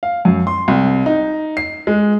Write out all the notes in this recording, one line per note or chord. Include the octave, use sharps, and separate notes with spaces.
F5
F#2
C6
C2
D#4
C7
G#3